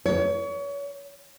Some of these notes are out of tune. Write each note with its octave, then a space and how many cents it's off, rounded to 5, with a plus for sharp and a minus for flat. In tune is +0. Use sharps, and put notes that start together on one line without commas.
C#5 +30